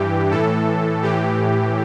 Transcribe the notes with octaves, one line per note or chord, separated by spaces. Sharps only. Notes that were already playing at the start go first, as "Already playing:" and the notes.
Already playing: G2 E3 G4
A2 E3 A4
A2 E3 G4